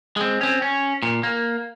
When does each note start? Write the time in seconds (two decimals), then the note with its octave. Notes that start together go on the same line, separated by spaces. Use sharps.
0.17 G#3 C4
0.41 C4 C#4
0.62 C#4
1.03 A#2
1.23 A#3